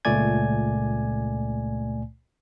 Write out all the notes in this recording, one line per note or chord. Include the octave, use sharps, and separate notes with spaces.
C#2 A#2 A3 D5 G#5 G#6